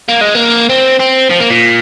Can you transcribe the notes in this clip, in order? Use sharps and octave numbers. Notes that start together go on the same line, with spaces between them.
A#3
G#3
A#3
C4
C4
F3
A#3
A#2